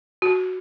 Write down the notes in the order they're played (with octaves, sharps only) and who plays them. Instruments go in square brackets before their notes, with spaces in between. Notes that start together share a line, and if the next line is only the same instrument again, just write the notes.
[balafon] F#4